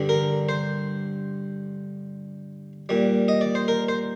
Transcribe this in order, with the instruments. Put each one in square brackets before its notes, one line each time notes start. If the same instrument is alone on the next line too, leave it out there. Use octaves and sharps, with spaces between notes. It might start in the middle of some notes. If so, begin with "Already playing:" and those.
Already playing: [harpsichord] G2 D3 G3
A#4
C5
A#2 G3
D#5
D5
C5
A#4
C5